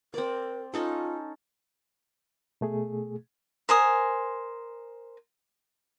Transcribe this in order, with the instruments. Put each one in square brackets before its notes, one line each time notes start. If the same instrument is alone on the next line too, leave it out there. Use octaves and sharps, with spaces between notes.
[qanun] C4 D5 [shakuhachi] A#4
[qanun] C#4 D#4 A4 [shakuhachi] F4
[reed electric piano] B2 A3 G#4
[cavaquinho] A#4 C5 G#5 D#6